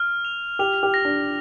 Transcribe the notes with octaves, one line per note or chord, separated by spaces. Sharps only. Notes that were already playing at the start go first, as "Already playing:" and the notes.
Already playing: F6
F7
G4 F7
G4
A#6
D4